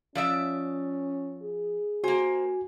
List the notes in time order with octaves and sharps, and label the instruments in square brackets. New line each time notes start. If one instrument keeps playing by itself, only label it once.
[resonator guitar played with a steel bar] F3 D5 E5 [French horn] C#4
[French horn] G#4
[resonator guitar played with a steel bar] A#3 C5 [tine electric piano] F#4 G#5